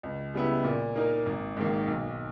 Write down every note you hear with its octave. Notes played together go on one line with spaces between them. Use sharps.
C#2
C#3 G3 B3 E4
A#2
A#3 D#4 A#4
G#1
G#2 D#3 A#3
B1